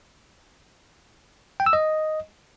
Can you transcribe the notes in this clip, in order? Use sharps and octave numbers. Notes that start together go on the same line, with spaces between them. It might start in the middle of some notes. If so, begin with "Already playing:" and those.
G5
E6
D#5